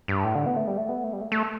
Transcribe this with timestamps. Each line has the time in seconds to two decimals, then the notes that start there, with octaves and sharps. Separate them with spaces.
0.08 G2
0.25 A2
0.35 D3
0.46 B3
0.56 A3
0.67 G3
0.77 A3
0.89 B3
1.04 A3
1.13 G3
1.21 A3
1.32 A3